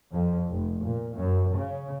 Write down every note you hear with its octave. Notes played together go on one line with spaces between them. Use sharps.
F2
F1
A#2
F#2
C#3